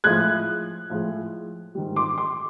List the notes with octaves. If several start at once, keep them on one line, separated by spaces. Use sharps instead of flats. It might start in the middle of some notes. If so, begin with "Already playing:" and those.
A2 F3 G#3 F#6 G#6
A2 F3 G#3
G#2 D#3 G3
C6 D6
C6 D6